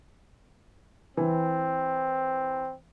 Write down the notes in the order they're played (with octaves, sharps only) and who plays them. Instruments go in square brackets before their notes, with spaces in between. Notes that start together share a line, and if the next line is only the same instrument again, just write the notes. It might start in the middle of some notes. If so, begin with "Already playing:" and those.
[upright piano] E3 [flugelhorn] C4